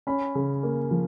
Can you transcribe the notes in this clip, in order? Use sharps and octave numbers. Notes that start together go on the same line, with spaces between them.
C#4 B5
C#3
A#3
F3